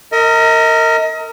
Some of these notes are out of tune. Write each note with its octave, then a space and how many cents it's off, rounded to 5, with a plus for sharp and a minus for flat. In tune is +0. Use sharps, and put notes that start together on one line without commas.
A#4 -25 D#5 +35